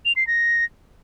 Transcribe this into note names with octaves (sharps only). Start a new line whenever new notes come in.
F7
C7
A#6